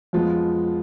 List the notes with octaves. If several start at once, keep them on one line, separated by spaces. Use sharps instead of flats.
F2 F3 G#3 B3 F4